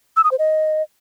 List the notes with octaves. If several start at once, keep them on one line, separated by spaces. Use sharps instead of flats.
E6
D#6
C5
D#5